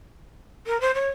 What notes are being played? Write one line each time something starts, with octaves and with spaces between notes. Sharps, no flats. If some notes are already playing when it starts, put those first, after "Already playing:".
A#4
C5
C#5